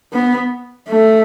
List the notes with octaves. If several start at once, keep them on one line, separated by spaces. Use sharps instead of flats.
B3
A3